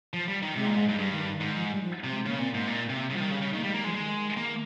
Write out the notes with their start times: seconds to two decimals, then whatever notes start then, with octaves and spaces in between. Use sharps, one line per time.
0.13 F3
0.28 G3
0.42 D#3
0.56 C3 G#3
0.66 A#2
0.77 G#2
0.88 G2
0.98 G2 G3
1.12 D#3
1.27 D#3
1.40 G#2 D#3
1.55 F3
1.70 G3
1.84 F3
2.04 C3
2.12 G#3
2.26 C#3 A#3
2.39 A#2 C4
2.54 G#2 A#3
2.67 A#2
2.90 C3
3.10 C#3 G3
3.15 F3
3.20 D#3
3.31 C#3
3.42 C#3
3.53 D#3
3.56 A#3
3.63 G3 G#3
3.74 G3 A#3
3.84 F3 G#3
3.95 D#3 G#3
4.37 A#3